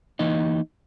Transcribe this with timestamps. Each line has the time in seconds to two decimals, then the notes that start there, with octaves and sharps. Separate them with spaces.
0.19 E3 A#3 D#4 D#5